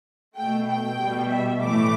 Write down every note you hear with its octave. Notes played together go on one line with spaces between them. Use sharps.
B2 A3 G5
G5
B2 G3
E5
A2 E3 A3 D6